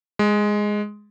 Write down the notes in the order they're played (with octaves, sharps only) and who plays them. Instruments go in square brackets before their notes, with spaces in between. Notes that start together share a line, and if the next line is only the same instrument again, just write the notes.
[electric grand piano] G#3